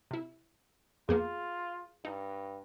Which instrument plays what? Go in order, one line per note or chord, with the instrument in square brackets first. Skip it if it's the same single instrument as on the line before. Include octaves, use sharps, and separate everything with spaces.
[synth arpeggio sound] C3 E4
[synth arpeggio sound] F2 A#3 B3 [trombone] F4 [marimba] G#4
[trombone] G2 [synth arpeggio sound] D#4